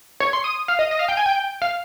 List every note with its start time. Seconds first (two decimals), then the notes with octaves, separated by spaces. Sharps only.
0.20 C#5
0.33 C6
0.44 D#6
0.68 F5
0.79 D#5
0.91 D#5
0.99 F5
1.08 G5
1.17 G#5
1.26 G5
1.62 F5